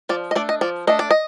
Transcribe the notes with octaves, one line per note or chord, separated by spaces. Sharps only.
F3 D5
D#5
A3 D4 D5
D#5
F3 D5
A3 D4 D#5
D5
D#5